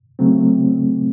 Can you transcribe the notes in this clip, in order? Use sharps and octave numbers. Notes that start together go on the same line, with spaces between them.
C#3 F#3 A3 C4